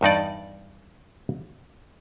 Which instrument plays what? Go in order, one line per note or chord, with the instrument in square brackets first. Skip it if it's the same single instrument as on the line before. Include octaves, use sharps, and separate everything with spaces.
[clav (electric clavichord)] E2 G2 D#4 D5